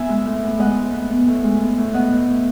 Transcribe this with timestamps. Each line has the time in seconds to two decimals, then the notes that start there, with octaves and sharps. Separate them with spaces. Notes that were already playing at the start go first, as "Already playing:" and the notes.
Already playing: B3 E5 G#5
0.09 G#3
0.26 A2
0.43 B3
0.59 G#3 D#5 F#5
0.76 A2
0.93 B3
1.10 B3
1.27 A2
1.44 G#3
1.60 B3
1.78 A2
1.94 B3 D#5 F#5
2.12 A2
2.29 A2